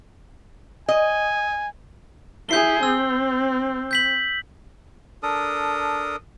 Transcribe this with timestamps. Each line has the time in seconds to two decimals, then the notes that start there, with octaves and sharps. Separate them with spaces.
0.89 D#5 G#5
2.49 E4 G#4 G6 C7 G7
2.83 C4 E6
3.91 G6 B6 F#7
5.23 D4 A4 A#4 D#6